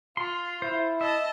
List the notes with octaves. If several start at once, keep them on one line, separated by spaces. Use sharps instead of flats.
F4 C6
E4 C5
D#5 E5 A5